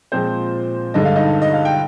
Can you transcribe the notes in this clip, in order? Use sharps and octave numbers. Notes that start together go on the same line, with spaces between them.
A#2 F3 G#3 C4 C5
G2 D3 G#3 D#5
F5
D#4 D#5
D#5
F5
G5